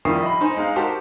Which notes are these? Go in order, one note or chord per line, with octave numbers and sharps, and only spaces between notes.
D#3 F3 G3 E4 D#6 C7
D#5 B5
D#4 C5 G#5
G#3 D#4 F5
F#4 G4 A#4 C5 A5